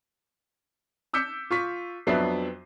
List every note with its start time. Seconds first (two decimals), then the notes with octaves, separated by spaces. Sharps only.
1.13 D6 E6 G6 B6 C#7
1.51 F4 C#6 B6
2.07 F2 F#3 B3 D4 E5 C7